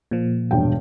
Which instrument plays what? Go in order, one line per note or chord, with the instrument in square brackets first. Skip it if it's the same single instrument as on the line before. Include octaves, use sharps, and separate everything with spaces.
[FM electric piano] A#2 F3
[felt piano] E1 G2 G5